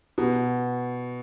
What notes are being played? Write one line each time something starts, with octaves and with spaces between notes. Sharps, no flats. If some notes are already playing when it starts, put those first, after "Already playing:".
B2